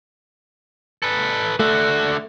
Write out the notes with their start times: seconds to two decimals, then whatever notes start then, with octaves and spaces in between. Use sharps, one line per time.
1.02 A4 B4
1.59 D3 A3 F#4